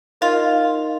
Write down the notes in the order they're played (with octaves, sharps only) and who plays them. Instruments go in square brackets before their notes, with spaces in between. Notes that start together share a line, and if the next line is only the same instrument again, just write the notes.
[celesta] D#4 A#4 D#5 [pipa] F4